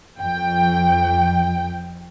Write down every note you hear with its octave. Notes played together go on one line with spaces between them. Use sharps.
F2 G5